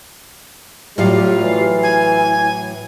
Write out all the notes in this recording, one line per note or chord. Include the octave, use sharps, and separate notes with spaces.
A2 F#3 G3 F4
E3
G#5